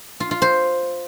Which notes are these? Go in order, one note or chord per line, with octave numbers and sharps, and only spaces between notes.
F4
F4
C5